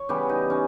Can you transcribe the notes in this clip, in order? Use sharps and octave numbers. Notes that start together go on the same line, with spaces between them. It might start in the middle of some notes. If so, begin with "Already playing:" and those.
Already playing: C#5
C#3 E3 G3 B3 G4
D#4
C#4